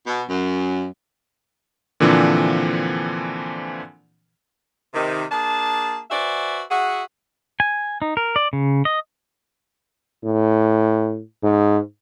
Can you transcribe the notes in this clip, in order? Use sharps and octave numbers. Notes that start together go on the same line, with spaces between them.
B2
F#2
A#2 D3 E3 F3 C4 D4
C3 D#3
A#3 D4 G#4 A5
F#4 B4 C5 D5 E5 G#5
F#4 G#4 E5 F#5
G#5
D#4
A#4
D5
C#3
D#5
A2
G#2